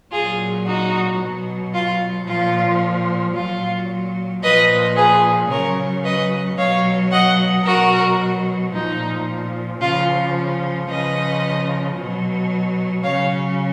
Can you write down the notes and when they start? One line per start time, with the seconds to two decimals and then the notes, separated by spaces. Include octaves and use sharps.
0.12 A#2 F#3 F4 G#4
0.66 D#4 F#4
1.19 B2 F#3
1.74 F4
2.27 A#2 F3 F4
3.34 A#2 F#3 F4
4.43 A#2 F3 B4 D#5
4.96 G#4 B4
5.50 C#3 F#3 A#4 C#5
6.04 B4 D#5
6.58 B2 F#3 C#5 F5
7.12 D#5 F#5
7.65 B2 F#3 F#4 A#4
8.73 A#2 F3 D#4
9.81 C#3 F3 F4
10.89 C#3 F3 B4 D#5
11.96 B2 F#3
13.03 C#3 F#3 C#5 F5